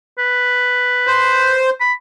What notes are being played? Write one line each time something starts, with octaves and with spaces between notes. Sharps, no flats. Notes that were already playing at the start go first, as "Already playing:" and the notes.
B4
C5
B5